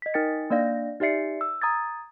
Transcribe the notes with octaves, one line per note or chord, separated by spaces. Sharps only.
D#5 B6
D#4 A#4 G5 A6 C#7
A#3 D4 D5 F5 A#6
D#4 G4 D5 E5 C7 C#7
E6
A#5 D#6 G#6 A6